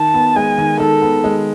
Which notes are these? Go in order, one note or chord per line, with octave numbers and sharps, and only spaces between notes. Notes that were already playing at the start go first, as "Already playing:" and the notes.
Already playing: D#3 A5
B3
G#3 G#5
D#3
D#3 A4
B3
G#3